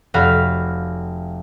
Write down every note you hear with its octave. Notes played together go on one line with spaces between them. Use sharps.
F1 F#4 F5 B5 F6